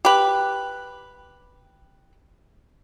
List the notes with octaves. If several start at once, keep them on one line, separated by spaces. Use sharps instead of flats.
G4 B4